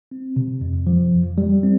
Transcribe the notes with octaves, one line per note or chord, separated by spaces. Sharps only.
C4
C3
F2
F3
F2
G3
C4